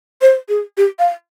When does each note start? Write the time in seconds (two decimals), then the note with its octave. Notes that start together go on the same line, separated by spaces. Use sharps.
0.22 C5
0.49 G#4
0.77 G4
0.99 F5